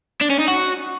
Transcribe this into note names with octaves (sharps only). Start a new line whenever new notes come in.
D4
C#4
D#4
F#4